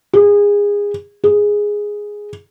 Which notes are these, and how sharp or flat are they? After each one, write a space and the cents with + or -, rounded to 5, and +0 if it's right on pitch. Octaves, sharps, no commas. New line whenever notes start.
G#4 -25
G#4 -5